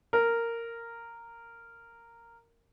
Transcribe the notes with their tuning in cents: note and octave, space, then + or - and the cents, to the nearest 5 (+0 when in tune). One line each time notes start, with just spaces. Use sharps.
A#4 -10